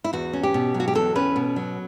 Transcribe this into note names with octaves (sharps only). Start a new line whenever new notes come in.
E4
E2 F#4
C#4
G4
B2
F#3
F#4
G4
E2 A4
C#4 B4
B2
F#3